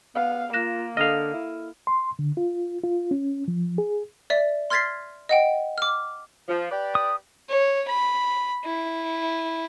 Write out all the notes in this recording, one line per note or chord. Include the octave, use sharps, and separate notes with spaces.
B3 F5
A#3 F4 F#6 A#6 E7
D3 A4 D#5 F5 F6
E4
C6
D3
F4
F4
C#4
F3
G#4
D5 E5
C6 F6 G#6 A6 B6 C7
D#5 F#5 G5
D6 F6
F3
G4 B4 D5
D#6
C#5
B5
E4